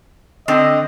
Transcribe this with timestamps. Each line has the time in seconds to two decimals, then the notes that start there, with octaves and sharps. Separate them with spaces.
0.48 D3 C4 D5 D#5